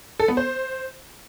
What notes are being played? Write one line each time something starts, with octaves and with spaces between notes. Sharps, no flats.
A4
B3
C5